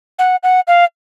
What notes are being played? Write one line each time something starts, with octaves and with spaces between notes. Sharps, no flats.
F#5
F#5
F5